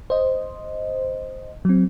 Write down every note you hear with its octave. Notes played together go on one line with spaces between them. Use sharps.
C5 D#5
F#3 C4